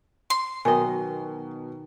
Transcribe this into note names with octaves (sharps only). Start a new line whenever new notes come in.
C6
B2 D#3 F#3 D#5 G#5